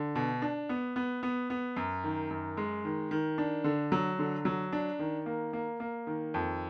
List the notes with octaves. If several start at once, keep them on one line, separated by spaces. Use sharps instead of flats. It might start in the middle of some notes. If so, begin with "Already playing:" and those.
Already playing: D3
B2
D4
B3
B3
B3
B3
F#2
D#3
F#2
G#3
D#3
D#3
D4
D3
F#3
D3
F#3
D4
D#3
A#3
A#3
A#3
D#3
F2